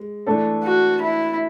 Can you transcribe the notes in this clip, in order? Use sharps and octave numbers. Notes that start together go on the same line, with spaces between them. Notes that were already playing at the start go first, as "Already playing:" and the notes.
Already playing: G#3
E3 A3 D4 A4
F#4
E4